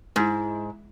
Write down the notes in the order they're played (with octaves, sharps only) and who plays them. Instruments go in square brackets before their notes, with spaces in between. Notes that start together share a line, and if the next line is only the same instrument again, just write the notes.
[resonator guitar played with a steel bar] G#2 [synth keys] G#3 E4